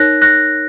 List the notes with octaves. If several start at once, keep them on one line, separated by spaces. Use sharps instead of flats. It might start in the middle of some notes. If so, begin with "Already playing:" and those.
Already playing: D#4 A#4 C#5 F#6 A#6
F#6 A#6